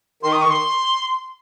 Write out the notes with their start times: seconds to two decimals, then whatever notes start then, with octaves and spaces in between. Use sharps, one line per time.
0.23 D#3 C6
0.32 D#6
0.42 C#6
0.50 C6